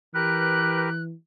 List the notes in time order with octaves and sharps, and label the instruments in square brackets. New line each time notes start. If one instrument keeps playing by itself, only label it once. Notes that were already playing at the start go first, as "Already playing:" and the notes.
[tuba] E3 [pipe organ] G4 A#4 B4 [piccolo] F#6